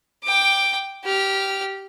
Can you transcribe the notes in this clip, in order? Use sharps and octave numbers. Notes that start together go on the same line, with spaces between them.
G5 D6
G4 F6